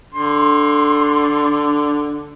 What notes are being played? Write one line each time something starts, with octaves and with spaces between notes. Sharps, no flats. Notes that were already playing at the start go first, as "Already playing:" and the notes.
D3 C6